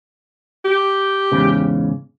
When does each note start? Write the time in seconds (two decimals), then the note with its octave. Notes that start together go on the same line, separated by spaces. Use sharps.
0.65 G4
1.32 E2 G#2 C#3